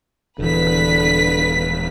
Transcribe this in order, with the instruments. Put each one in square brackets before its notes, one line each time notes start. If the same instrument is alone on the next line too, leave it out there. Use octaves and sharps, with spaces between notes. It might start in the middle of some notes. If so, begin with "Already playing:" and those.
[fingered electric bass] D#1 E3 [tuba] D3 [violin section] B4 B6